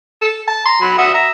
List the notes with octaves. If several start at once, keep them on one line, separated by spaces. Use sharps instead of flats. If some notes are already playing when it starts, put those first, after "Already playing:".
A4
A5
A#5 C6
F#3 B5
F#4 E5 F#5 D#6
E5 A#5